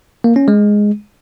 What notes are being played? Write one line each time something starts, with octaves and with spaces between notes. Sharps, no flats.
A#3
C#4
G#3